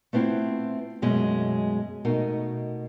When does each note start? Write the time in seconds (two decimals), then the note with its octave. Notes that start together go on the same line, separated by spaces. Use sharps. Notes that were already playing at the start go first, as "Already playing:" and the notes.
0.13 A3 B3 C4 E4 F4
1.02 F#2 B2 G#3 A3 C#4
2.05 B2 A3 D#4 A#4